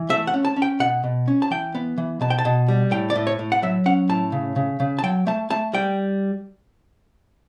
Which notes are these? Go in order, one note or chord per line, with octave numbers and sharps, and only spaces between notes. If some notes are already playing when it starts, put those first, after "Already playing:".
Already playing: E3
A3 E5
F#5
C#4
A5
C#4
G5
B2 F#5
B2
C#4
A5
E3 G5
B3
E3
B2 A5
G5
A5
B2
G3
A2 G5
D5
A2
C#5
A2
F#5
F#3 E5
C#4 F#5
A2 A5
C#3
C#3
C#3
A5
F#3 G5
A3 A5
A3 A5
G3 G5